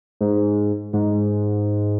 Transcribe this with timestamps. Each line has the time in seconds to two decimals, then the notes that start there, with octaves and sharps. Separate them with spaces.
0.21 G#2
0.93 G#2